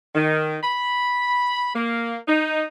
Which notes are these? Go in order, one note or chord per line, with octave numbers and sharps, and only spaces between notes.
D#3
B5
A#3
D#4